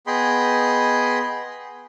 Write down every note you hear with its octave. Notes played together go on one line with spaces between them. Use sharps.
B3 G#4 D#5 G5 B5 C6